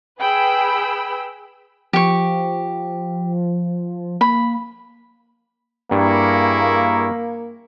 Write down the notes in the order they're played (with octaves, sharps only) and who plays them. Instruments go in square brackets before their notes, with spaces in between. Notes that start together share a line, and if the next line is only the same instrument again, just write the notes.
[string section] G#4 B4 G5 B5 E6
[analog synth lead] F3 [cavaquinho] G4 C#6
[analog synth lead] A#3 [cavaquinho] B5
[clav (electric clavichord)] G2 [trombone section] A#3 [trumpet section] E4 G#4 C#6